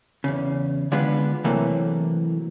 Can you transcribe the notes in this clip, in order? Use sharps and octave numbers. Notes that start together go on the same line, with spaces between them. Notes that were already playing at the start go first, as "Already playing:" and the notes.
E2 C#3
D3 G#3 B3 D4 F4 B4
C3 E3 F#3 A3 A#3